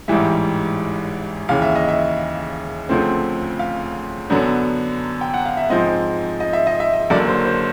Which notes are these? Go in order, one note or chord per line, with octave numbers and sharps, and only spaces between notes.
A1 G#2 E3 G3 E5
D#2 C#3 E3 F5
E5
D#5
E5
D2 C#3 F3 A3 C4
F5
F#2 D3 F#3 B3 D4
G5
F#5
F5
E5
G#2 F3 G#3 C4 D#5
D#5
E5
D#5
E5
D#5
F#1 F#2 D3 F#3 A#3 D5
C5
C5